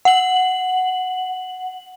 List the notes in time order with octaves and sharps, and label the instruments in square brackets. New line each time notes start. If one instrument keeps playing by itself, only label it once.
[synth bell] F#5 F#7